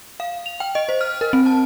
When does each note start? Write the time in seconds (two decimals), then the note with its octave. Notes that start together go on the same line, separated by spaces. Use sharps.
0.20 F5
0.46 F7
0.60 G5
0.75 D#5
0.89 C5
1.01 F6
1.21 A#4
1.33 C4
1.46 A5